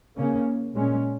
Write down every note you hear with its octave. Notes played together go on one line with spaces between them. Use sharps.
C#3 A#3 C#4
A#2 G#3 C#4